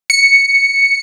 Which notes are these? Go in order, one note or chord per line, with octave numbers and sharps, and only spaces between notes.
C#7